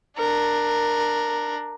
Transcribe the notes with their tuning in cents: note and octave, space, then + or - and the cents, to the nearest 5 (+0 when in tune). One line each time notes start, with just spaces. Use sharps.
D4 +15 A#4 +0